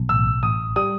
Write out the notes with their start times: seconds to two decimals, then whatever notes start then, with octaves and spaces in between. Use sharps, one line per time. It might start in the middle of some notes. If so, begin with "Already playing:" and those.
Already playing: B1
0.09 A1 E6
0.43 A1 D#6
0.76 G3 D#6